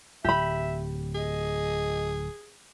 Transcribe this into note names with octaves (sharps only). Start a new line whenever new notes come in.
D1 G4 E5 B5
G#4 D#5